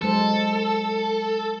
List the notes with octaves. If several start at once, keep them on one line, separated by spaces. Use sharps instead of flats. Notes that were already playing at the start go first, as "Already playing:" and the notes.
F#3 G#3 A4 C5